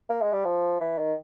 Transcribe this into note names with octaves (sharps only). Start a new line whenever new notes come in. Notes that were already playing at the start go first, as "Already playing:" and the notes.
A#3
G#3
G3
F3
E3
D#3